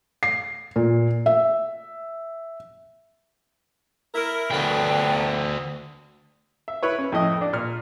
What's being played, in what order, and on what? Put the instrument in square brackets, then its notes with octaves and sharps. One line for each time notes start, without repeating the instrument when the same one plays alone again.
[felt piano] C7
A#2
E5
[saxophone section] E4 A#4
[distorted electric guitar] D2 G5 [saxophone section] B3 D4 A4
[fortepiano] E5
E4 B4 C#5
C#4
F2 A2 D#5
D4 D5
A#2 F6